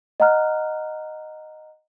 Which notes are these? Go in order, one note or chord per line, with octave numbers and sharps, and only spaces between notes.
D#5 F#5 A#5 F6 F#6